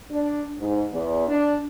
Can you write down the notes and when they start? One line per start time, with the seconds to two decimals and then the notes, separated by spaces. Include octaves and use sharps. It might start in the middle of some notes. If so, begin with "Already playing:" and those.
0.11 D4
0.59 G#2
0.92 E2
1.28 D4